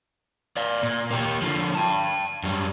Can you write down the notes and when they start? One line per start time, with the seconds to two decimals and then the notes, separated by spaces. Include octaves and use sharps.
0.57 D5 F5
0.83 A#2
1.11 A#3 G4
1.42 D3 F3
1.75 G5 A5
2.43 F#2 G3